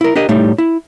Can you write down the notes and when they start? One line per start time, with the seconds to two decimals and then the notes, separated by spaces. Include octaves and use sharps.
0.01 E4 A#4
0.15 D4 G4 A#4 D#5
0.29 A2 G3 A3 D#4
0.58 E4